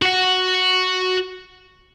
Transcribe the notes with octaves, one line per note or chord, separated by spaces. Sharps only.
F#4 F#5